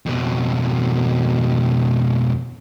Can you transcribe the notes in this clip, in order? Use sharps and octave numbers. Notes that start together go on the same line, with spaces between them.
F2 B2